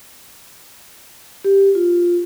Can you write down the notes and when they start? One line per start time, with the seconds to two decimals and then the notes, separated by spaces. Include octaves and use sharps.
1.44 G4
1.75 F4